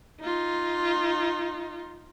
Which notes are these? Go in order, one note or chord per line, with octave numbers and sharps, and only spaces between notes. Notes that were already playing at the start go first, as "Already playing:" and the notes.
D#4 F4